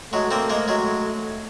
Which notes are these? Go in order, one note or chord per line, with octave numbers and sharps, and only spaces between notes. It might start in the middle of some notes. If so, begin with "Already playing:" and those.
F#3 G#3 A3
A#3 C4
G#3 A#3
F#3 G#3